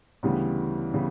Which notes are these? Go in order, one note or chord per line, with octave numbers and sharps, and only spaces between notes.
D2 C#3 E3 G3 B3
C#3 E3 G3 B3